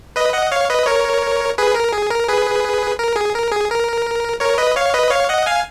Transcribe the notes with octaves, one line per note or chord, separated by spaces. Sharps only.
B4 D#5
D#5 F#5
C#5 F5
B4 D#5
A#4 C#5
G#4 B4
A#4
G#4
A#4
G#4 B4
A#4
G#4
A#4
G#4
A#4
A#4 C#5
B4 D#5
C#5 F5
B4 D#5
C#5 F5
D#5 F#5
F5 G#5